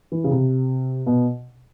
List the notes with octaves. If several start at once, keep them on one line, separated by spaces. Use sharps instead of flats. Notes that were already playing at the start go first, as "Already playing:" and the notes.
E3
C#3
C3
B2